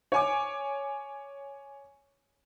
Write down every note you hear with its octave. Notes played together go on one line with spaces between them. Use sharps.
C#5 G#5 D6